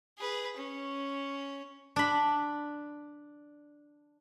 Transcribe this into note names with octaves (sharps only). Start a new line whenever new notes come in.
G#4 B4
C#4
D4 B5